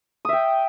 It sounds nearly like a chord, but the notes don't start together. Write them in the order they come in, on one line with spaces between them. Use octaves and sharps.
D#6 E5 G5